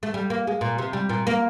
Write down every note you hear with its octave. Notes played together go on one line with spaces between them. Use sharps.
A3
G3
A#3
G#3
A#2
C3
G3
A#2
A#3